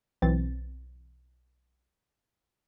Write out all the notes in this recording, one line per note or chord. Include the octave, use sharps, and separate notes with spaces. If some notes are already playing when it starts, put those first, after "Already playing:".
B1 E3 C4 A6